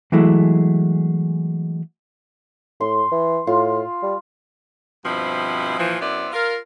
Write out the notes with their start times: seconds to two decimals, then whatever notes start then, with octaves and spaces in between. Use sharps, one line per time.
0.12 E3 F#3 G#3 A3 E4
2.81 A2 C6
3.12 E3
3.47 A2 F4
4.03 G3
5.04 G2 B2 F3 C4 E4
5.78 A#2 E3 F3
6.01 F#2 B3 C4 E4 D5
6.32 F4 A#4